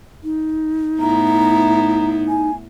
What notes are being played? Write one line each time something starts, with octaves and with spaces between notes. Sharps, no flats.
D#4
A2 B3 E4 A#5
G#5